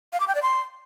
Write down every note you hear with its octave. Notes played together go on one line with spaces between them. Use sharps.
F5
D6
G5
D5
C6